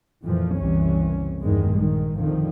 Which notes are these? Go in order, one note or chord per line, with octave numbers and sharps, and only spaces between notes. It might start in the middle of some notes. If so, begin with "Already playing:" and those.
F2 A#2 E3 F3
F#1 C2 C3 E3 C#4
E2 G2 D#3 G#3
A#1 D#3 G#3
F1 A#1 F2 D3 D#3 F3